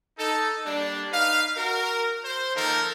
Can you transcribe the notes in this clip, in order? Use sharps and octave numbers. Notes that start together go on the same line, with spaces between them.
D#4 A4
G3 A#3 D4
D#4 B4 F5
F#4 A#4
C5
D#3 F3 A#3 A4 A#4